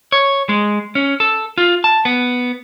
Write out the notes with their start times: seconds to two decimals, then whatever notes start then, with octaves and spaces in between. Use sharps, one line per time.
0.12 C#5
0.49 G#3
0.95 C#4
1.20 A4
1.58 F4
1.84 A5
2.05 B3